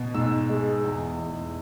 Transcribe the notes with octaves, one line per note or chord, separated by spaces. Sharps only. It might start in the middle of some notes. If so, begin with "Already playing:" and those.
Already playing: B2
G#2 E6
G#3
E2
E2